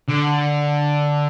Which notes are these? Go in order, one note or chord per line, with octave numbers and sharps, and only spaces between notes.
D3